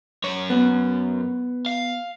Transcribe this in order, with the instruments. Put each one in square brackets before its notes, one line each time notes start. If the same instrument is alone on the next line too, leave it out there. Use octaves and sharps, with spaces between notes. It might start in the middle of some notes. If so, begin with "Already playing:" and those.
[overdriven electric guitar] F#2 C#5
[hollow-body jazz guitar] B3
[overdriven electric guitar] F5